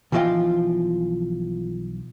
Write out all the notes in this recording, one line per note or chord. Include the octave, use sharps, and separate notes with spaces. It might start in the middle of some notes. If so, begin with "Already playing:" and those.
B1 E3 F3 F4 D#5 G5